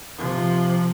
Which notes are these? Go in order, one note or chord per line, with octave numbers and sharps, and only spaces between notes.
C3 F3